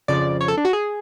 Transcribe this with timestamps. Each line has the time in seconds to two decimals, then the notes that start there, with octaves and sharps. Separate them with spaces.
0.08 F2 C#3 F3 D5
0.41 C#5
0.48 A4
0.57 D4
0.65 F#4
0.73 G#4